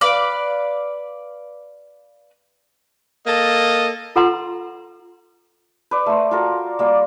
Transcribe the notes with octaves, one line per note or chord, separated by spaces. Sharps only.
B4 D5 F5 D6
A#3 A4 D#5
F4 A4 B4 F#5 A#5 C6
B4 D5
A3 C5
F4 F#4 A4 A#4
G3 A#3